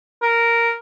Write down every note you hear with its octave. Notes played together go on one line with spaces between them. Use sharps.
A#4